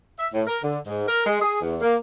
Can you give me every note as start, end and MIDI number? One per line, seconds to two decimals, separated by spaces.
0.19 0.28 76
0.33 0.43 45
0.47 0.58 70
0.63 0.78 50
0.86 1.03 44
1.08 1.24 70
1.26 1.41 56
1.41 1.60 68
1.61 1.77 40
1.81 1.96 58